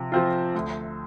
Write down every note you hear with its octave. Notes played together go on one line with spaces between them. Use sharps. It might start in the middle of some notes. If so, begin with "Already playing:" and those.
Already playing: C3 F3
F3 C4 F4
D2